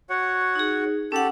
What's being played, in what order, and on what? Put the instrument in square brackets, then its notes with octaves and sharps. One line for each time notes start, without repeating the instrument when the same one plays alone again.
[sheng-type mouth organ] F#4 C#5 F#5
[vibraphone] D#4 G#4
[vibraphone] C#4 F#5 [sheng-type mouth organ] G4 A4